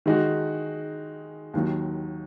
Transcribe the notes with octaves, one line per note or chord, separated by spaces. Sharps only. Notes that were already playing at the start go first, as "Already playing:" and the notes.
D#3 G#3 D#4 F#4
D#2 D#3 F#3